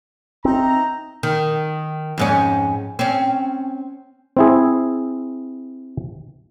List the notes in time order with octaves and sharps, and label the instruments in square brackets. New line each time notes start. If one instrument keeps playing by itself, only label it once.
[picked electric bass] C4 [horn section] D#4 E5 A#5
[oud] D#3
F2 G#2 C#4
C4 C#4
[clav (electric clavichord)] C4 E4 G#4